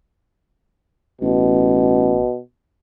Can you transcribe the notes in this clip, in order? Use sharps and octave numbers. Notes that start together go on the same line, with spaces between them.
A1 B2